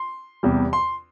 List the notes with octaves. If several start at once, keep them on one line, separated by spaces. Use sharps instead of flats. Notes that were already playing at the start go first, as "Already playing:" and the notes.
Already playing: C6
E2 C3 G3
C6